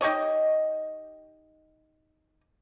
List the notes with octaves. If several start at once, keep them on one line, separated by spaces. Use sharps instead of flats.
D#4 G4 C#5 D#5